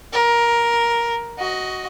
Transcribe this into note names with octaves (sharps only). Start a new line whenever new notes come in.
A#4
F#4 D#5